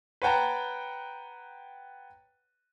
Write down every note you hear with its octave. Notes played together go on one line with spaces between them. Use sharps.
B4 C#5 F#5 G5 A5 A#5